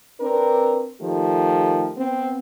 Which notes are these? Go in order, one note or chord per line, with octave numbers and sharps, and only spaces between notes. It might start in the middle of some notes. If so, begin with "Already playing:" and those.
C4 D4 A#4 B4
D#3 F3 A3 G4
B3 C4